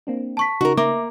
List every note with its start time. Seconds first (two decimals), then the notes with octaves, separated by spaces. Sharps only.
0.07 A#3 C4 D4
0.37 A5 C#6 B6
0.61 C#3 D#4 F#4 A#4 C#6
0.78 A#3 E5 D6